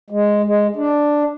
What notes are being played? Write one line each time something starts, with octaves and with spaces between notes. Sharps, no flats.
G#3
G#3
D4